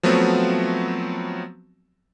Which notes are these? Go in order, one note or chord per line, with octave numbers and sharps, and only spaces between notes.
F3 F#3 A3 B3 C4 F#4